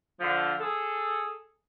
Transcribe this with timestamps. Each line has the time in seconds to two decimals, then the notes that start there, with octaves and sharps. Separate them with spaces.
0.20 D3 F3
0.60 G#4 A4